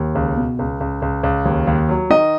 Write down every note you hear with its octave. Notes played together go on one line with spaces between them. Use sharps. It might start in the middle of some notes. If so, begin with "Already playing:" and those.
Already playing: D#2
C#2
B2
C#2
C#2
C#2
C#2
D#2
D#2
F#3
D#3 D#5